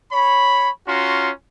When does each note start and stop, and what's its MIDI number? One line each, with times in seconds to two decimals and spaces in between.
0.12 0.69 73
0.12 0.69 83
0.88 1.30 61
0.88 1.30 65
0.88 1.30 66
0.88 1.30 82
0.88 1.30 84